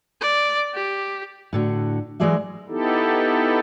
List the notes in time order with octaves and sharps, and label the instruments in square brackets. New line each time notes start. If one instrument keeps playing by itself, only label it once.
[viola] D5
G4
[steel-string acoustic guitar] A2 D3 F#4
E3 F#3 G#3 G#4 D5 E5
[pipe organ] B3 D#4 E4 G4 A4